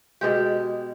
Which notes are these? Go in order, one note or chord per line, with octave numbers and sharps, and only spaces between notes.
B2 G#3 G4